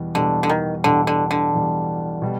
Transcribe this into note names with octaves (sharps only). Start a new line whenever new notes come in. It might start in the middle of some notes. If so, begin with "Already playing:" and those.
Already playing: E2 B2 G3
E2 B2 D3 G3
D3
D#3
E2 B2 D3 G3
D3
D3
E2 B2 G3
B2 G3